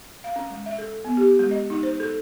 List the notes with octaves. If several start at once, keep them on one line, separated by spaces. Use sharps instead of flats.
F5
C#4
G#3
E5
A4
B3
G4
G#3
D#5
D#4
C5
A4